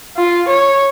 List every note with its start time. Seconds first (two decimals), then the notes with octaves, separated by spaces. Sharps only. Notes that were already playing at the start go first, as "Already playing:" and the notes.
0.17 F4
0.49 C#5